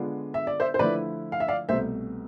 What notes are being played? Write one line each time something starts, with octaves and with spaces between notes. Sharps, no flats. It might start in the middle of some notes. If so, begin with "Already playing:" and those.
Already playing: D3 G#3 B3 D4 F4
E5
D5
C5 E5
C5
D3 F3 A3 E4 B4 D5
F5
E5
D5 F5
C2 B2 A3 C5 E5